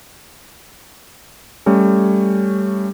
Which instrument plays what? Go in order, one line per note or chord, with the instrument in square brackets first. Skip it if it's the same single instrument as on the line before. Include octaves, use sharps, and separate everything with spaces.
[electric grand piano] G3 A3 C#4